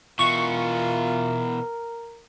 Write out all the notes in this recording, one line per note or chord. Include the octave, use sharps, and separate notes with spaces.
B2 E3 F4 A#4 C#6